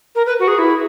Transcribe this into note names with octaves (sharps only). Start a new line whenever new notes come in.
A#4
B4
F#4
G#4
E4